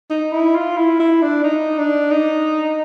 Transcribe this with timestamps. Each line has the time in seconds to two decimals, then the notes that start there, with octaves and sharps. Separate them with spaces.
0.10 D#4
0.32 E4
0.55 F4
0.77 E4
1.00 E4
1.22 D4
1.44 D#4
1.78 D4
2.11 D#4